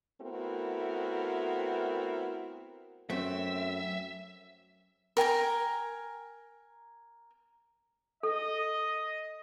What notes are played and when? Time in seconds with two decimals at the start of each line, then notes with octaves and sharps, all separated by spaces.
0.22 A3 B3 C4 E4 F#4 A#4
3.10 F#2 F#3 A3 C4 E5
5.17 A#4 G5 G#5 A#5
8.23 A4 D#5